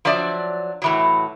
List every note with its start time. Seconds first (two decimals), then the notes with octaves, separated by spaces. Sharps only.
0.05 F3 F#3 D4 D5 E5
0.82 A2 E3 F#3